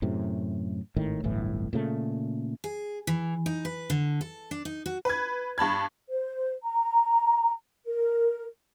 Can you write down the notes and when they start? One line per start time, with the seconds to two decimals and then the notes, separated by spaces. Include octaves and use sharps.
0.02 F#2 A2 C3
0.96 G#1 A2 D#3
1.24 D1 G1 A2 E3
1.73 A#2 C#3 A3
2.64 G#4
3.07 E3
3.46 D#4
3.65 B4
3.90 D3
4.21 A4
4.51 D4
4.65 D#4
4.86 F#4
5.05 B4 G#6
5.58 G2 A5 B5 G#6
6.09 C5
6.64 A#5
7.86 A#4